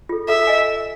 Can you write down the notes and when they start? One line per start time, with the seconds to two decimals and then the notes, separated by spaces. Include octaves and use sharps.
0.09 F4 A4
0.29 A4 E5
0.47 D#5 G#5